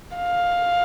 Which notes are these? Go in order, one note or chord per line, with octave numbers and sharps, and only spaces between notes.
F5